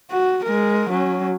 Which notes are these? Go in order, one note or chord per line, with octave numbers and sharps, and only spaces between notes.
F#4
G#3 A#4
F#3 C#4